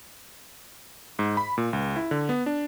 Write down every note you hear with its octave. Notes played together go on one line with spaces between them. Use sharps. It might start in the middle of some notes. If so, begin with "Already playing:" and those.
G#2
B5
A#2
C#2
E4
D3
B3
D4